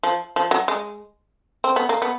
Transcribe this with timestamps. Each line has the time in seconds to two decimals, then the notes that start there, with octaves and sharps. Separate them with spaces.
0.03 F3
0.36 F3
0.51 F#3
0.68 G#3
1.64 C4
1.76 B3
1.89 A#3
2.02 B3